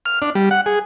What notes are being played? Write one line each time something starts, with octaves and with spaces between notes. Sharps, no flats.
F6
D4
G3
F#5
G#4